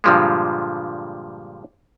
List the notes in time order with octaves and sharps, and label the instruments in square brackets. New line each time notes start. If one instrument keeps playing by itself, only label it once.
[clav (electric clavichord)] G2 A#2 D3 F3 G3 G#3